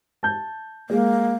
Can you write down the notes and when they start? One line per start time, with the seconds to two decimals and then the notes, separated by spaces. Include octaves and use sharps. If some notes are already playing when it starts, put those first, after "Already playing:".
0.23 A5 G6
0.90 G#3 A#3